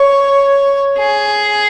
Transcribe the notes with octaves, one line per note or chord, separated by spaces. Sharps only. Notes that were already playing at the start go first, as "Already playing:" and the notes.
Already playing: C#5
G#4